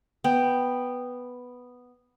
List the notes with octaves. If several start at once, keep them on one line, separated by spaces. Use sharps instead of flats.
B3 G5